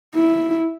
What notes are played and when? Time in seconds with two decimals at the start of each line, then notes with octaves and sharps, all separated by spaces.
0.15 E4